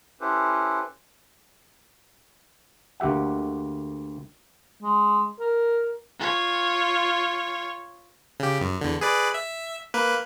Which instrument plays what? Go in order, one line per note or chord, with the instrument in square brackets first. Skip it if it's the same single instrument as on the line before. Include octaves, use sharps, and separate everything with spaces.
[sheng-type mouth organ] C#4 E4 G4 A4 B4 C5
[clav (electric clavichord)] D2 A#3 G4 E5 F#5
[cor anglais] G#3
A#4
[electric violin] F4 C#5
[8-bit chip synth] C#3 G4
F#2
E2 D3
G#4 B4 D5
E5
A#3 B4